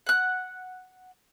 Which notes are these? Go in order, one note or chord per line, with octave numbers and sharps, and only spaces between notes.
F#5 F#6